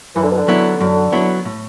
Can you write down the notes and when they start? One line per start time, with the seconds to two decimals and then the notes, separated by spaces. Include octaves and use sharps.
0.16 F#2 E3
0.23 D3
0.30 B2
0.38 D3
0.48 F#3 B3 E4
0.81 F#2
1.13 F#3 B3 E4
1.45 A2